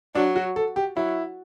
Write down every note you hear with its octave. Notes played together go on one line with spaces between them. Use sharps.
F#3 D4
F#4
A4
G4
F#3 E4